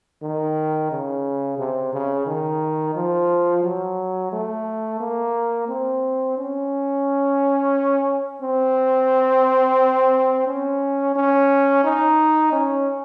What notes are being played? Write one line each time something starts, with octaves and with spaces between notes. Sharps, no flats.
D#3
C#3
C3
C#3
D#3
F3
F#3
A3
A#3
C4
C#4
C4
C#4
C#4
D#4
C#4